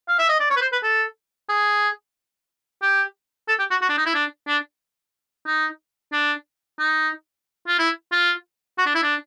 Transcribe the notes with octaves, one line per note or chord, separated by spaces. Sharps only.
F5
E5
D#5
D5
C#5
B4
C5
B4
A4
G#4
G4
A4
G4
F#4
F#4
D4
D#4
E4
D4
D4
D#4
D4
D#4
F4
E4
F4
F#4
D4
E4
D4